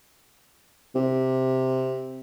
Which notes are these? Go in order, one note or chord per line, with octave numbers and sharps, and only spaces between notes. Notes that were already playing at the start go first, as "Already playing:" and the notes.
C3